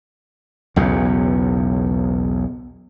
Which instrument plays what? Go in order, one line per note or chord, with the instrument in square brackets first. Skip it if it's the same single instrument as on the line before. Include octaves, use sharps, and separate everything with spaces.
[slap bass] B1 E2 C#3